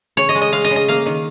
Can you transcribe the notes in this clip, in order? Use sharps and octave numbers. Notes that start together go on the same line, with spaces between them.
C#3 C#5
D#5
G#3
D#5
G#3 F5
D#5
C#3
D#5
A#3 F5
D#3